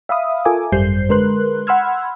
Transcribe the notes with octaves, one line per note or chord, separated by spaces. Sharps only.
E5 F5 B5 D#6
F4 A4 A#4 E5 G#5 D6
G#1 F#2 G3 C5 G6 C7
D3 G#3 A#4 B4 C6 F#6
F#5 B5 C6 E6 F6 G#6